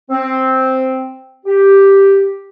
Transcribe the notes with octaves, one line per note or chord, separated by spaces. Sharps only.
C4
G4